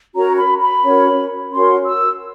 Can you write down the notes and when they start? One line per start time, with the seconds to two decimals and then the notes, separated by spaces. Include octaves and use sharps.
0.15 C#4 F#4 A#4 C#5 A#5
0.38 B5
0.61 B5
0.83 C#4 F#4 A#4 C#5
1.52 C#4 F#4 A#4 C#5 C6
1.86 E6